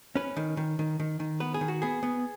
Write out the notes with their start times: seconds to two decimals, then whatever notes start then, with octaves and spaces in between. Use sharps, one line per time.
0.16 C#4 B4
0.37 D#3
0.57 D#3
0.79 D#3
1.00 D#3
1.20 D#3
1.40 B3 B4
1.54 G#4
1.61 D#3
1.68 F#4
1.82 B3 G#4
2.03 B3